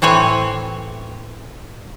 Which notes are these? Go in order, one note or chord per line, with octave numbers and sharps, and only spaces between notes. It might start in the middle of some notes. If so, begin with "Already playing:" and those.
A2 E3 C4 C#5 G#5